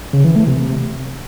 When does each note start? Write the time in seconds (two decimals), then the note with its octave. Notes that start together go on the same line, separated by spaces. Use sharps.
0.13 C#3
0.24 E3
0.36 A3
0.47 C3